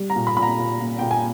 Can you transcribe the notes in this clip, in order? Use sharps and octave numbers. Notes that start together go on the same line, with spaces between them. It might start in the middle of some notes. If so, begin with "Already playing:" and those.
Already playing: G3
A#5
A#2
B5
A#2 B5
A#5
A#2
A#2
A#2 G5
G#5